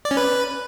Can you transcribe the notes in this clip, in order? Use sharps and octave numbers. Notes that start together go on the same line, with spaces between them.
D5
C#4
B4